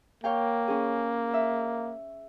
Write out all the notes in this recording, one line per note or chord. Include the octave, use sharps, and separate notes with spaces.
A#3 C#5 F5 G5
C#4 G#4
E5